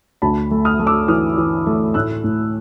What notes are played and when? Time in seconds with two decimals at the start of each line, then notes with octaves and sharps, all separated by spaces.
0.22 D2 A5 B5
0.51 A3
0.65 D#6 F6
0.80 A3
0.87 D6 E6
1.08 E3 D#6 F6
1.38 E3
1.66 A3
1.94 A2 E6 F#6
2.24 A2